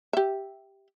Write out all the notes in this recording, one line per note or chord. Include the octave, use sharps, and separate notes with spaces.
G4 E5